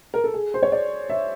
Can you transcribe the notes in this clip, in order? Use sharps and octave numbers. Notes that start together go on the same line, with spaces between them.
A#4
A4
G#4
C5
C#5
D5
E5